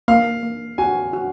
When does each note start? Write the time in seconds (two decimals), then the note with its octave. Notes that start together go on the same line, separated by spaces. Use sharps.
0.08 A#3 F5
0.43 A#3
0.78 F#4 G#5
1.13 F#4